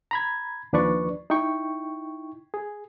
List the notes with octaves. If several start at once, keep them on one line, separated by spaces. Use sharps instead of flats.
A#5 B5 G#6
D#2 F3 D4 B4 D5 C#6
D#4 E4 G5 C#6
G#4